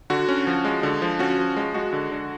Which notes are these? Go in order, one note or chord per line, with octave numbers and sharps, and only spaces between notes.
D3 F#4
C#4
F3
G#3
D3
F3
C#4 F#4
F3
G#3
G#3 F#4
D3
D3